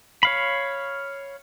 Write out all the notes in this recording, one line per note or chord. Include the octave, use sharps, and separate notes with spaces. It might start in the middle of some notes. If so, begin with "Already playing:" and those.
C#5 F5 B5